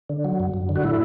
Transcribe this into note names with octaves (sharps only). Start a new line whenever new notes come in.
D3
F#3
F#2
F#2
D3
F#4
A2 E4